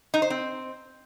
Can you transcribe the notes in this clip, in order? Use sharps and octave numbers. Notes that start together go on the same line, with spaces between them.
D#4
C5
C4